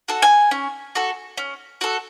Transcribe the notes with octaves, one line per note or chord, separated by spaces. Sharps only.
F#4 A4
G#5
C#4
F#4 A4
C#4
F#4 A4